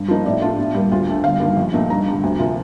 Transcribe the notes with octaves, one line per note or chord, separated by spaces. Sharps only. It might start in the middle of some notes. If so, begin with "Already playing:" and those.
Already playing: G2
F3 A#3 D#4
A2 D5
A3 D4 F4
A2
G3 A#3
D2 F4
D3 A3
G1 F5
G2 D#3 G3 A#3
A#1
A#2 A3 D#4
G2 A#5
D3 G3
D2
C3 F3 A#3 F4